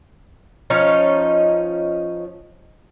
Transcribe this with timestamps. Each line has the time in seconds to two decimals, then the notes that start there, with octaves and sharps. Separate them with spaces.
0.70 F3 C#4 D#4 C#5